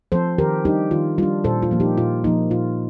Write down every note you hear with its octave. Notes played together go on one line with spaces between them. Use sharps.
F3 C4 A4 C5
D#3 G4 A#4
G3 D4 D#4 G4
D#3 F4
G3 D4 F4
A#2 A4 C5
F4
F3 A#3
D#4 G4
A#2 F4
F3 A#3 D#4
A#2 F4